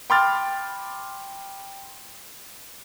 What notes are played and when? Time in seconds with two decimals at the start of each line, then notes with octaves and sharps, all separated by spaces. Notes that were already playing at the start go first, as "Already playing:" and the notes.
0.10 G5 B5 C6 D6 F6 A6